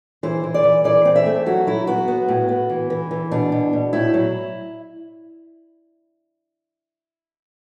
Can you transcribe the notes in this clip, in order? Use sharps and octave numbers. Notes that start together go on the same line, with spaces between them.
E3 C5
E3
D5
E3
E3 D5
C4
E5
A3
F#3 F#4
F#3 E4
B3 F#4
B3
A2
B3
E3
E3
E3
B2 D4
B2
B2
A2 E4
F#3